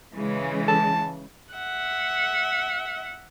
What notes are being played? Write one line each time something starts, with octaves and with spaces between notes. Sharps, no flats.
C#3 E3 G#3
A5
E5 F#5